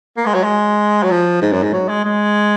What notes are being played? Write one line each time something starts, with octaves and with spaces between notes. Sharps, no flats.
A#3
G#3
F#3
G#3
F#3
F3
G#2
F#2
G#2
F#3
G#3
G#3